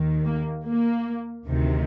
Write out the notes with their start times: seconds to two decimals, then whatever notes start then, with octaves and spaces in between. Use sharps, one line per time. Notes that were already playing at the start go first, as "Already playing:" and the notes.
Already playing: D#2 D#3
0.25 A#3
0.65 A#3
1.46 D2 C3 D#3